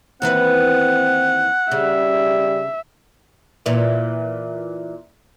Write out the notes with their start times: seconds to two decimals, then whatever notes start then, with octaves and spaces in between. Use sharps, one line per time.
0.22 D#2 E3 C4 B4 F#5
1.72 C#3 G3 E5
3.66 A#2 E3